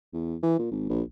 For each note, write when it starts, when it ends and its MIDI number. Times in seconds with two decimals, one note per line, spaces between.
0.13 0.35 40
0.43 0.58 52
0.59 0.67 46
0.71 0.88 32
0.89 1.02 34